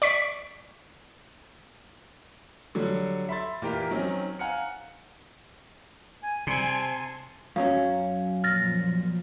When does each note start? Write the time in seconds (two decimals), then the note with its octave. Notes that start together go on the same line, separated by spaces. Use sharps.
0.02 D5 C#6 B6 D7
2.75 D3 F#3 G3
3.29 E5 B5 C6 A6
3.62 A#2 E3 G4 A#4 A#5
3.91 D#3 F#3 C4 C#4
4.39 F5 F#5 G#5 A#5 F6 C#7
6.23 G#5
6.47 C3 G3 G#5 C6
6.67 A5
7.56 F#2 F#3 C#4 F5
8.44 A#2 F3 F6 A6 A#6